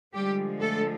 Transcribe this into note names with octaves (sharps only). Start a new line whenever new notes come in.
D3 F3 G3 G#3 G4
A3 A4